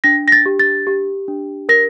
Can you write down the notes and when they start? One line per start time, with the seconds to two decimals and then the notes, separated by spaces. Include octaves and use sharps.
0.04 D4 A#6
0.28 A#6
0.32 A6
0.46 G4
0.59 A6
0.87 G4
1.28 D4
1.69 A#4 A#6